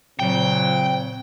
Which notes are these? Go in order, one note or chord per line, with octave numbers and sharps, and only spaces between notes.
A#2 C#3 F#3 C4 G5